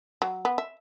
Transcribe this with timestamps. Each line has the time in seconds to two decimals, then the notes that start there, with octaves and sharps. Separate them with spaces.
0.22 F#3
0.45 B3
0.58 E5